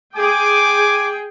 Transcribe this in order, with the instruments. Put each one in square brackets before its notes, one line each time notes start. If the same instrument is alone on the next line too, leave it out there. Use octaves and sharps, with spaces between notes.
[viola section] G#4 G5 [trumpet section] G#5 D6